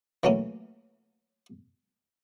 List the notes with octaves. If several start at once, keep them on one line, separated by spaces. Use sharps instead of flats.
E3 F#3 A3 A#3 C#4